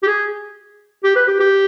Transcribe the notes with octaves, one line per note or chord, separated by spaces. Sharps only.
G4
G#4
G4
B4
G4
G4